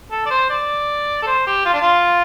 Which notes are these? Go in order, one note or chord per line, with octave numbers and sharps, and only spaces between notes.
A4
D5
C5
D5
A4
C5
G4
F4
D4
F4